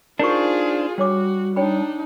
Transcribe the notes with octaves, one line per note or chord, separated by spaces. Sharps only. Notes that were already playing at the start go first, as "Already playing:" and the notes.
D4 D#4 F4 G#4 A#4 C5 A#5 C#6
G3 D4 F#4 C#5 D6
D4 D#4 C#5 G5 B5